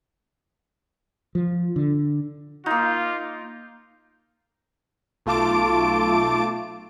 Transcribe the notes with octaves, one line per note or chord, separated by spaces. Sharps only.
F3
D3
A#3 D#4 F4
B1 A3 F4 A5 D6 D7